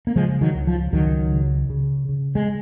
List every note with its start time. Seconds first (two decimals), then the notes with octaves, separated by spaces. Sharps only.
0.07 A#3
0.16 C#3 F3 G#3
0.41 D#3 F#3
0.54 C#2
0.67 F3
0.92 C#2 D#3 F#3
1.32 C#3
1.70 C#3
2.09 C#3
2.35 G#3